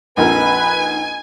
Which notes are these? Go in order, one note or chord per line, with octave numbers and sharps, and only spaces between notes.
A#1 F2 D#4 A#4 B4 G#5